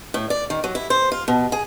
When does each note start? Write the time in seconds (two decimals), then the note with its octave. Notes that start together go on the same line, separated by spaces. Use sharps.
0.14 A2
0.30 D5
0.50 D#3
0.64 F#3
0.75 E4
0.90 C5
1.12 F4
1.28 B2
1.52 G#4